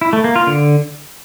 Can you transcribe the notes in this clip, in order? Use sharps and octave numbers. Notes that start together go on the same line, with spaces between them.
E4
A3
A#3
F4
D3